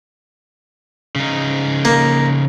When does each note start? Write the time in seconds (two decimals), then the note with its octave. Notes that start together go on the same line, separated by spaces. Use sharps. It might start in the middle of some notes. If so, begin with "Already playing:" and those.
1.16 C#3 D#4
1.85 A#3